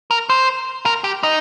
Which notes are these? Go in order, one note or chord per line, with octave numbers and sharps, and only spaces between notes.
A#4
C5
A#4
G4
D#4